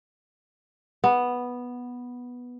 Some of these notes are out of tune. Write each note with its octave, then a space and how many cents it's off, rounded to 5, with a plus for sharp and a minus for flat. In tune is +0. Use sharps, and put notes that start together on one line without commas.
B3 -5